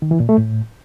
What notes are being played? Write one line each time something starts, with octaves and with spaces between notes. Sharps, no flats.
D#3
E3
A#2
A3
A2